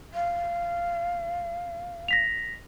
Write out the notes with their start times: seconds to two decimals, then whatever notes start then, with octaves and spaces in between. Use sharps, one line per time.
0.14 F5
2.08 A#6 B6 F7